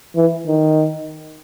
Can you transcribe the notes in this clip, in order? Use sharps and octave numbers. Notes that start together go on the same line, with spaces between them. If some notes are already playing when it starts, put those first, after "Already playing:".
E3
D#3